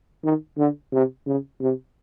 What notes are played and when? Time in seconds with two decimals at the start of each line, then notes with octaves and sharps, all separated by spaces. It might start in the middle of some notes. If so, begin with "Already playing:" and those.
0.24 D#3
0.58 D3
0.93 C3
1.27 C#3
1.61 C3